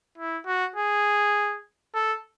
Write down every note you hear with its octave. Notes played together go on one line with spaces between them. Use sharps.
E4
F#4
G#4
A4